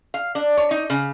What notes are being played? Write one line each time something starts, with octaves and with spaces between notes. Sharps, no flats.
F5
D4
C#5
D#4
C#3